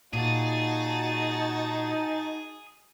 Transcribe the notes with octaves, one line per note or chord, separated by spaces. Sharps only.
A#2 D#4 F#4 G#4 A5 A6